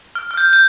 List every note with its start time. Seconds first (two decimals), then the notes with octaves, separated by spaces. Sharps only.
0.15 F6
0.31 F6
0.37 G6
0.53 G6